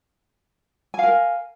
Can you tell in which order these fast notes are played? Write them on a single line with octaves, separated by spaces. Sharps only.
G#5 F5 A#4